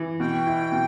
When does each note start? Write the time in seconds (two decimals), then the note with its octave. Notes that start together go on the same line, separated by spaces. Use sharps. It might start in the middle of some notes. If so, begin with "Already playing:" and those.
Already playing: E3
0.20 B2 G5
0.47 E4
0.72 B2